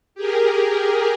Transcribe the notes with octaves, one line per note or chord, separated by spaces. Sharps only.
G4 G#4 A#4